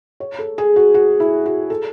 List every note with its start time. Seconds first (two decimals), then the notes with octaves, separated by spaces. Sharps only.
0.20 C#5
0.39 A4
0.58 G#4
0.76 F#4
0.94 F#4
1.20 E4
1.46 F#4
1.70 A4